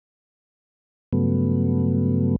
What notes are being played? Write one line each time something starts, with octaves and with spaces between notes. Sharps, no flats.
G2 C#3 F#3 A3 B3